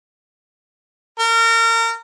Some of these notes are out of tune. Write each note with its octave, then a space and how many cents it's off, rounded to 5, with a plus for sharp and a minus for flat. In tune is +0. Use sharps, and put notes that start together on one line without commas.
A#4 -30